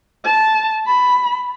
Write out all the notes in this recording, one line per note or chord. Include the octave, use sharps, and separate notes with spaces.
A5
B5